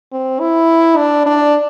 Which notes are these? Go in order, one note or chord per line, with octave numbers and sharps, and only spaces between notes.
C4
E4
D4
D4